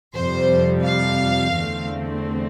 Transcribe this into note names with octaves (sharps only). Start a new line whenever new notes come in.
F2 C3 G3 C5
F5
E2 D3 A3 C4